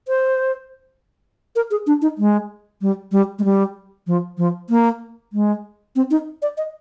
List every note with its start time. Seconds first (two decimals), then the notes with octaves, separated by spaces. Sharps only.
0.08 C5
1.56 A#4
1.71 G#4
1.87 D4
2.02 D#4
2.18 G#3
2.81 G3
3.12 G3
3.39 G#3
3.44 G3
4.07 F3
4.38 F3
4.70 A#3
5.33 G#3
5.96 C4
6.11 D#4
6.42 D5
6.57 D#5